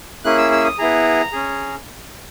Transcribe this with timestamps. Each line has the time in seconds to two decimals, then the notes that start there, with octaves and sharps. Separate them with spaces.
0.24 A#3 C#4 E4 G#4 F#6
0.38 E6
0.52 E6
0.65 D#6
0.78 B3 E4 G#4 A#5
1.32 C#4 G#4